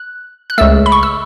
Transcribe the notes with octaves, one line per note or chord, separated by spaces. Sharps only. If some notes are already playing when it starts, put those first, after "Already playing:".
Already playing: F#6
F#6
C#2 C#3 A3 E6
B5
C#6
E6